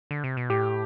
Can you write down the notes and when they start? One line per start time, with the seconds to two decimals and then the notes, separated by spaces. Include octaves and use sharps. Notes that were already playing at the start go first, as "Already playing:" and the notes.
0.11 D3
0.24 C3
0.37 B2
0.50 A2 G4